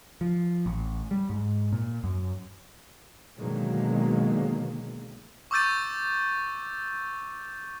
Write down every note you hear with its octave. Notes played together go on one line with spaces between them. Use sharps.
F3
A1
G3
G#2
A#2
F#2
B2 D3 D#3 F#3 G#3 A#3
C#6 D6 E6 G6 A6 D#7